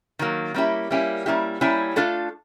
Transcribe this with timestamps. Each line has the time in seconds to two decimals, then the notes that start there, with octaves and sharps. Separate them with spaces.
0.19 D#3 F#3 A#3
0.54 G3 A#3 C#4 E4 G4
0.91 G3 A#3 C#4 E4 G4
1.26 G3 A#3 C#4 E4 G4
1.61 G3 A#3 C#4 E4 G4
1.96 A3 D4 F4 A4